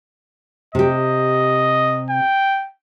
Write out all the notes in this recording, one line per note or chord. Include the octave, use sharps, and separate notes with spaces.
C3 G4 D#5
G5